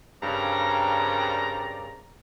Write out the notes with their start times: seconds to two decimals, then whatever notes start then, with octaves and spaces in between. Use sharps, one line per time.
0.23 G2 C#3 C4 A#4 D5 A#5